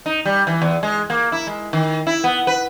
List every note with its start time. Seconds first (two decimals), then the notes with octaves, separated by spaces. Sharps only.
0.06 D#4
0.25 G3
0.47 E3
0.62 E2
0.83 G#3
1.10 A#3
1.32 E4
1.47 G#3
1.73 D#3
2.07 E4
2.24 B3
2.47 B4